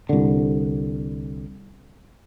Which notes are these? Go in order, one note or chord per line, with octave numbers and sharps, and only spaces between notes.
C2 D3